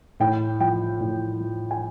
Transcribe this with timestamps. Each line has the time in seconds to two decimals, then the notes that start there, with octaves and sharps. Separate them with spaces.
0.20 A2 G5
0.60 F3 G5
1.01 A2
1.40 F3
1.71 G#5